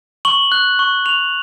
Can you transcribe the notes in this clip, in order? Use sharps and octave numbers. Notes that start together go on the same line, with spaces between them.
C#6 F#7
F#6
C#6
C#6 F7